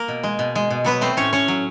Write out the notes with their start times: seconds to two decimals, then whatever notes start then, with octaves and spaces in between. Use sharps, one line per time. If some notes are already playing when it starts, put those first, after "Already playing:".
Already playing: A#3 A#4
0.08 B2
0.23 G#3
0.39 B2
0.55 G#3
0.70 B2
0.84 F#3 B3 B4
1.01 A3 C4 C5
1.17 A2 C#4 C#5
1.33 A2 C#4 C#5
1.48 F#3